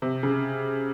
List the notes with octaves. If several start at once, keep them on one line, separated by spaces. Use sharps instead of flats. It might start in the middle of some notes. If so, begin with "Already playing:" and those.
C3
C#3